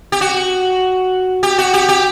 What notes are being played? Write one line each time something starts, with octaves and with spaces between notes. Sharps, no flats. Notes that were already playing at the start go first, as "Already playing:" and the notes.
G4
F#4
G4
F#4
G4
G4